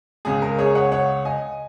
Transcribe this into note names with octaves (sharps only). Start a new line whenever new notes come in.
C#2 C#3 G#3 G#4
A#4
G#4 C#5
C#5 F#5
C#5 F#5
D#5 G#5